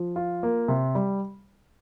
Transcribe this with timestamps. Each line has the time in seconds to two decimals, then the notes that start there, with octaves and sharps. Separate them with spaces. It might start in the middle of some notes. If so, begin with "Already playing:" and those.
Already playing: F3
0.16 F4
0.43 A#3
0.68 C3
0.95 G3